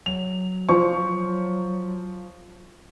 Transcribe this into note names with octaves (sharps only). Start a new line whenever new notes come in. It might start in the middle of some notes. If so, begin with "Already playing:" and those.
F#3 F7
F3 C5 C#6